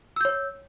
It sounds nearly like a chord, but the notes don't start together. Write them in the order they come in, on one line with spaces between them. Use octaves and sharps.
E6 G6 C#5